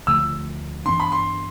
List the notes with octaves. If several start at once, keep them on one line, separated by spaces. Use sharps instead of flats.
D2 D3 F3 A3 E6
G2 E3 B3 D4 C6
B5
C6